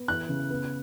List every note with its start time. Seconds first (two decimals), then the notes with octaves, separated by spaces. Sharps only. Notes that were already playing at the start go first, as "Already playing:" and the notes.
Already playing: B3
0.08 E3 F#6
0.29 C#3
0.50 B3